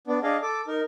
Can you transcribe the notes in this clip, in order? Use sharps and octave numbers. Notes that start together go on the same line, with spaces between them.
B3 D4
D4 G#4 D#5 F5
A4 D6
D#4 A#4